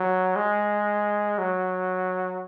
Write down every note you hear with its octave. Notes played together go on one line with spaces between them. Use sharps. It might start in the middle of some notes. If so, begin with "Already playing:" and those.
Already playing: F#3
G#3
F#3